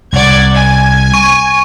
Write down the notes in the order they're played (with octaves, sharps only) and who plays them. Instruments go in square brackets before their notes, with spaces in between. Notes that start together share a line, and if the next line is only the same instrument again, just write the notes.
[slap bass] C2 [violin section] D5 F#5 G#6
[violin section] G#5
[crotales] C#6 D#7